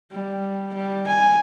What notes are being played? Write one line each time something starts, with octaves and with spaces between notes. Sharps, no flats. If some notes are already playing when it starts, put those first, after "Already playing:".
G3
G3
G#5